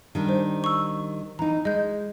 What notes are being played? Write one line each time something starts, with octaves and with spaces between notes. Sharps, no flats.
D#3 G3 D4
C5
C#6 E6
E3 D#4 A#5
G#3 D#5 G6